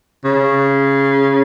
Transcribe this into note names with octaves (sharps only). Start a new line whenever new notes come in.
C#3